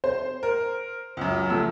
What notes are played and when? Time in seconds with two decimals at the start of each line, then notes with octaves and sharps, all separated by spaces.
0.04 C5
0.43 A#4
1.17 C#2 F#2
1.50 F3 A3 E6